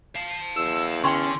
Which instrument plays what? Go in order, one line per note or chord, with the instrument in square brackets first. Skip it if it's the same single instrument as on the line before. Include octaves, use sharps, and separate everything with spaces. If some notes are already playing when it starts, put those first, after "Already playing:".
[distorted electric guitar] F5 A5
[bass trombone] E2 [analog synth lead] E6
[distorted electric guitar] D3 [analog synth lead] C#4 [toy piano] G5 C6 C#6